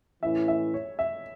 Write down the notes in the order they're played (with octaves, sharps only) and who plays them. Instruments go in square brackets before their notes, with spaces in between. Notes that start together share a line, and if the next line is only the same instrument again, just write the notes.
[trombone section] A2 E3 C#4 E4 [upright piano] E5
[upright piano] E5
C#5
E5